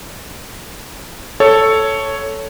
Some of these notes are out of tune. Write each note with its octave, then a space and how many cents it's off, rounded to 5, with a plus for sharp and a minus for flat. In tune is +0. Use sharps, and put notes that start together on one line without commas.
A4 +0 C#5 +0